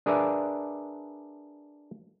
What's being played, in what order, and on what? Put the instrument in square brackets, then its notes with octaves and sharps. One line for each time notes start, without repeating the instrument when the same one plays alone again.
[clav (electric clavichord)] D4 G#4 A#4 B4 D5 E5